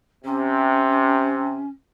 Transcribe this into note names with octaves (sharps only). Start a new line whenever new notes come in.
C3 C#4